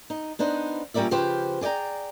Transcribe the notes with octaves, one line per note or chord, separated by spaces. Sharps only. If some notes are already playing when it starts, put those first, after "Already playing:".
D#4
B3 D4 D#4 C5
A#2 G3 C#4 A#4 D5 E5
C#3 F3 G4 B4 C5
G#4 D5 D#5 G5 A#5